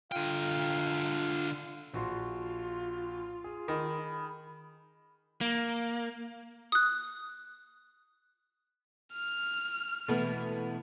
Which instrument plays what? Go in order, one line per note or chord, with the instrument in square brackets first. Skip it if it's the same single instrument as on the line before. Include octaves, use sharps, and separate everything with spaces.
[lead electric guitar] D3 G5 [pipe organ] F4 F5
[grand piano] A#1 F#4 C6 [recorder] F4
[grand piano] G#4
[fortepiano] D#3 [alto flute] B5
[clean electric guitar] A#3
[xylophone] D#6 F#6
[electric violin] F6
[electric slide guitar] B2 E3 E4 [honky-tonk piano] A3 B3